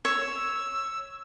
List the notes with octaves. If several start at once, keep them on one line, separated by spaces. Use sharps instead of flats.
C#5 E6